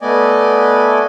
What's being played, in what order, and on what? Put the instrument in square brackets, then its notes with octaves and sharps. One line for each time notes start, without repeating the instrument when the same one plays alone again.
[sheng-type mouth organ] A3 B3 D5 D#5 G#5